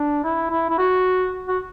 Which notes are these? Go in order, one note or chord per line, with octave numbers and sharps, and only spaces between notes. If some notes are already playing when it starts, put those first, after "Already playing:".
Already playing: D4
E4
E4
E4
F#4
F#4